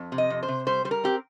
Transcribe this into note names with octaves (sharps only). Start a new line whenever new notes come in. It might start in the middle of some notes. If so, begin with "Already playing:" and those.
Already playing: F2
C3
D#5
F2
C5
C3
G3 C5
G3 C5
A#4
C4 G4